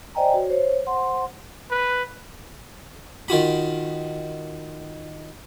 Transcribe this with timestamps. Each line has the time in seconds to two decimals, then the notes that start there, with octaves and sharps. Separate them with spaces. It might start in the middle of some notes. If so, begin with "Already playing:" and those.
0.15 C5 D5 D#5 G5 G#5 A#5
0.34 F#4 C#5
0.50 C5 C#5
0.87 C5 F#5 C6
1.71 B4
3.28 D#3 F4 F#4 B5